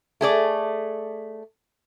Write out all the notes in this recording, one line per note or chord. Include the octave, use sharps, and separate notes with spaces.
A3 G#4 D5